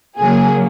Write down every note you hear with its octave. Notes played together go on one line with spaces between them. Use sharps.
C#3 F#3 A#3 G#4